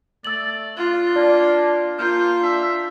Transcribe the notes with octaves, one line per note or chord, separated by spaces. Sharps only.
A3 D5 E6 A6 F#7
D4 F4
A#3 D4 D5
A#3 F4 C5 F6 G6
D4 E5